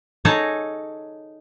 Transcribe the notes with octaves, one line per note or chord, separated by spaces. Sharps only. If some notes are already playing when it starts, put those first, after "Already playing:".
D#4 G#4 A4 C#5 A5 A#5